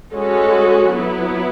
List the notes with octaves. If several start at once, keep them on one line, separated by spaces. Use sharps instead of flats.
G#3 C#4 F#4 A4
F#3 B3 E4